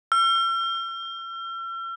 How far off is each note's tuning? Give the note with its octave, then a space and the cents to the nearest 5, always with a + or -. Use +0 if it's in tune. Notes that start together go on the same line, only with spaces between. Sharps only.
E6 +45